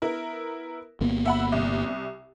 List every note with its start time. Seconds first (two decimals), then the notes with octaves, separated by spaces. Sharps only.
0.02 B3 E4 A#4
1.01 G1 A#3 B3
1.26 E5 F#5 B5
1.52 C2